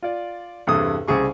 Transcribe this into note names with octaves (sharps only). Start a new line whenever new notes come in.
F4 D5
E2 G2 C3 A4 D#6
C2 C#3 G#4 C#6